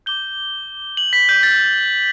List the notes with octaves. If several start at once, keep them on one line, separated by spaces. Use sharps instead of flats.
D6 G6 G7
F#7
B6
G6
A6